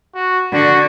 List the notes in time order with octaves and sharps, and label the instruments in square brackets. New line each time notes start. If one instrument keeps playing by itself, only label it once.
[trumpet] F#4
[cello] D3 [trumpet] F#4